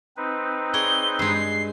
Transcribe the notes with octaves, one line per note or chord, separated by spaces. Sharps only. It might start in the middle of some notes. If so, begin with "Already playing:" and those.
C4 D#4 B4
G#4 C#5 D5 G7
G2 G#3 C7